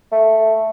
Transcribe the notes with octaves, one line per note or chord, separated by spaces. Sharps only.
A3